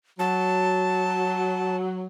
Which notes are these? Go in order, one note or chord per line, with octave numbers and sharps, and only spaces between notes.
F#3 A5